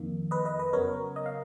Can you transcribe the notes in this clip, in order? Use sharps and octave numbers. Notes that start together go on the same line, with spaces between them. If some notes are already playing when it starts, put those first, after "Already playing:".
Already playing: F2 D#3 A#3
B4 D#5
B4 D#5
B4 D#5
C#3 F#3 B3 A#4 C#5
D#5
F5